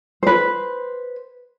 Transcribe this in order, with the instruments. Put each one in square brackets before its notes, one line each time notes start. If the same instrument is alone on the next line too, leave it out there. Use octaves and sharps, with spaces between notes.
[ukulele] B4 C5